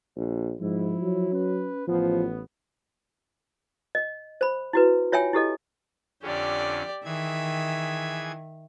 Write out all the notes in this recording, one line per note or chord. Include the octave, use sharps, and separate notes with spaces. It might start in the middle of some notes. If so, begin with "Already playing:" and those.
A#1
G#2 F3 E4
F#3
C#4 B4
A1 F3 B3
D#5
C5 B5
E4 F#4 B4
F4 C#5 E5 G5 G#5
E4 G4 A4 D#5
F2 D3 C#4 G4 D5
D#3 E3 G#4 E5 G#6